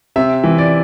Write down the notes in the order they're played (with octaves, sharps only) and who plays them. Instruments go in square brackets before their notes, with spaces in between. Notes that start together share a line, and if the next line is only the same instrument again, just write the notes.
[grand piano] C3 E5
E3
D5